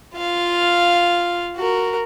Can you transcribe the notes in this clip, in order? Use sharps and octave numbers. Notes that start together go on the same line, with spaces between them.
F4 F5
F#4 A#4